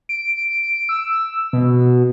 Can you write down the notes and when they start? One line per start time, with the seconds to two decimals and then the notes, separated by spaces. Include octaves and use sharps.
0.09 D7
0.89 E6
1.53 B2